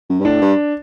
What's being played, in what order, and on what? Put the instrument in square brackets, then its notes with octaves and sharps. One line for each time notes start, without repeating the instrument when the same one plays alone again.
[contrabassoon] F#2
G2
[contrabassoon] A2 [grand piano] D4
[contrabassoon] G2